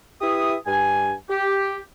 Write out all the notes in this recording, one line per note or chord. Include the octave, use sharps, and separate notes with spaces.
E4 G4 B4 E5 D#6
G2 G#5
G4